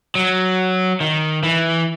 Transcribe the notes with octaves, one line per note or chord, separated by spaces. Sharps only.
F#3
D#3
E3